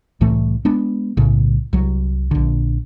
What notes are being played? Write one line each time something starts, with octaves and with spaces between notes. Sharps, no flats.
C2 A2 E3 A3
G#3 B3 D4
B1 A2 C#3
C2 F#3
A#1 D3